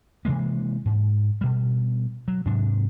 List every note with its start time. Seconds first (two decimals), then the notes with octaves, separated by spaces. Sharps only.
0.25 C3 E3 G#3 A#3
0.85 G#2
1.41 B2 G3
2.28 F#3
2.46 G#2 C3 F#3 D4